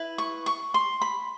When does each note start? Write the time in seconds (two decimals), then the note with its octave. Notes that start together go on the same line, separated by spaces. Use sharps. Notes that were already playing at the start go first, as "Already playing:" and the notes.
Already playing: E4 B4
0.18 C#6
0.46 C#6
0.74 C6
1.02 B5